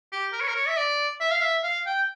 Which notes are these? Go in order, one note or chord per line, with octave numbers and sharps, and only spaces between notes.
G4
A#4
C#5
A#4
C#5
E5
D5
E5
F5
E5
F5
G5